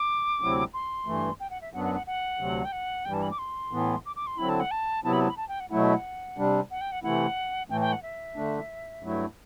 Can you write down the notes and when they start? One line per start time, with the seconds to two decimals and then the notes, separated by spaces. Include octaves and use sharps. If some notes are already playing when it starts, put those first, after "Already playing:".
Already playing: D6
0.40 D2 C3 F#3 C4 E4
0.74 C6
1.06 G2 E3 A3
1.40 G5
1.50 F#5
1.62 E5
1.73 F#2 F#3 B3 D4 F#5
1.84 F#5
1.95 F#5
2.07 F#5
2.39 D2 C3 F#3
2.65 G5
2.72 F#5
3.05 G2 E3 G3 G5
3.14 A5
3.22 B5
3.31 D6
3.39 C6
3.71 A2 E3 B3
4.06 D6
4.16 D6
4.27 C6
4.38 D3 F#3 C4 E4 B5
4.49 A5
4.60 F#5
4.71 A5
5.04 C3 F#3 B3 E4 A5
5.13 B5
5.21 A5
5.30 B5
5.37 A5
5.49 G5
5.60 F#5
5.70 B2 F#3 A3 E4 F#5
5.82 E5
5.93 F#5
6.37 C3 G3 D4
6.71 F#5
6.81 G5
6.92 F#5
7.03 C3 E3 A3 E4 F#5
7.70 A2 E3 A3 G5
7.81 G5
7.92 F#5
8.02 E5
8.36 D3 A3 D4
9.02 G2 F#3 A3 E4